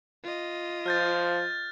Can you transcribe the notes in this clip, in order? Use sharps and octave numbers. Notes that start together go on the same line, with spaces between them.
F4 D#5
F3 F6 G6 A6